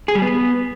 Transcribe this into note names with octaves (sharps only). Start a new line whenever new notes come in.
G#4
G3
B3